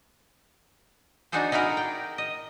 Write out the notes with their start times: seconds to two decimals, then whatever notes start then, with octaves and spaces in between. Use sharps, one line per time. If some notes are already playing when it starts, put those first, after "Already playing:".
1.32 D4 D#4 F#4 G#4 A4 C5
1.52 D#4 E4 F#4 G#4 A#4
1.77 G5
2.18 D#5